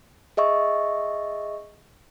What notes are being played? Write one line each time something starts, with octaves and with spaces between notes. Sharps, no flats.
G#4 D#5 E5 C#6